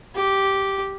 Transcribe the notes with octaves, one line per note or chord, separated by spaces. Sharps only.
G4